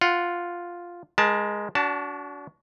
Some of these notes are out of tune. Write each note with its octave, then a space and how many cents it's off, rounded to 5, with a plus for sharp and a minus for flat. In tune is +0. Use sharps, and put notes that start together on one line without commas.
F4 +0 F#5 +0
G#3 +0 A#4 +35 A5 +0
D4 -35 F#4 +10 A5 +0